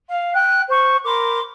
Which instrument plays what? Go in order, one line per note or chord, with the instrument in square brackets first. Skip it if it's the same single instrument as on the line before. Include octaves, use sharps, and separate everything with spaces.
[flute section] F5
G5 F#6
C5 C#6
A#4 B5 C6 D6